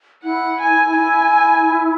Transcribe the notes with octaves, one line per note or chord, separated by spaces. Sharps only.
E4 F#5
G#5
E4 G#5